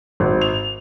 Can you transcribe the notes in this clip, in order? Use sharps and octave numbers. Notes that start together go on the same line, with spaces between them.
G#1
F7